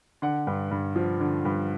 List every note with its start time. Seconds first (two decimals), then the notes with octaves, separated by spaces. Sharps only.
0.22 D3 F#5
0.47 G2
0.71 G2
0.96 F3
1.20 D3
1.45 G2